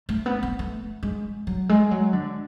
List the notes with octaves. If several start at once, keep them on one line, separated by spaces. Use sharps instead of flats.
A3
B3
B3
A3
G#3
F#3
G#3
F#3
D3